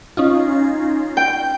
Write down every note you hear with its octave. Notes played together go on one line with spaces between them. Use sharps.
C#4 D#4 F4
G5 G6